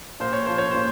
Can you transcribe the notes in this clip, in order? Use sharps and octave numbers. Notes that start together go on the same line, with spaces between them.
A#2 C5
C#5
F3 C5
C#5
A#2 C5